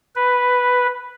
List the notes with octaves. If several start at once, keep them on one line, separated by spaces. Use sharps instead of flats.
B4